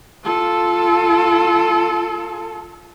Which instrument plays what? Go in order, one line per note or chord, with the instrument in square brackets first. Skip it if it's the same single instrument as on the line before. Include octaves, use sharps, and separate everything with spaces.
[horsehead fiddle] F4 A4